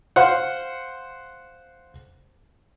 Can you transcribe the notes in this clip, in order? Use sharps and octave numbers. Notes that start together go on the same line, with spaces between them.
C5 F5 F#5